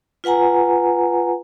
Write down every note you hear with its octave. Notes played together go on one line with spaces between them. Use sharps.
F4 B4 F#5 G#5 A#5